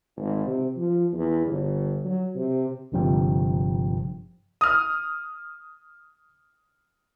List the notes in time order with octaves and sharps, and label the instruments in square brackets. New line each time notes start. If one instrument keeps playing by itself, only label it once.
[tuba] G#1
C3
F3
E2
G1
F#3
C3
[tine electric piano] G1 G2 C3 F3 G5
[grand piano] D#6 F6